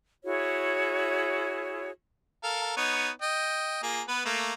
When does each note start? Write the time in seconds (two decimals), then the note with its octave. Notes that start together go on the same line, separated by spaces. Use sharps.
0.24 E4 F#4 G#4 C#5
2.43 A4 A#4 F5
2.77 B3 D#4 C#5
3.22 D#5 G5
3.83 A#3 F4 G#4
4.08 B3 B4
4.25 A3 A#3